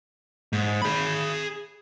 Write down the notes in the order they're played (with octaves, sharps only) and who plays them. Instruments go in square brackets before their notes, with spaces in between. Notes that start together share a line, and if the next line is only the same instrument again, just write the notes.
[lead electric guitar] G#2
G#4 B5